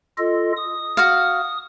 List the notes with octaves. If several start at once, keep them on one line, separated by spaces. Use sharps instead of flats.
F4 A4 D#5
D#6
F#4 F5